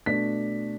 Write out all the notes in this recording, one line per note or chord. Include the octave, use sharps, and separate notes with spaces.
B2 A3 D4 B6